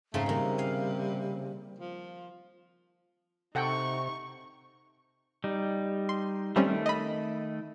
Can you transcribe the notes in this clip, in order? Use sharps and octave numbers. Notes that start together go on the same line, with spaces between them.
G#2 C#3 A3 C4
C3 D#3 G3 A#3
F5 G#5
F3
C3 D#4 A4 F#5 G5 C#6
G3 D#4
C6
D#3 G3 A3 C4 C#4
D#5 B5